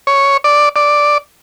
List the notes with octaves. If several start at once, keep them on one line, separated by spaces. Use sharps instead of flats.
C#5
D5
D5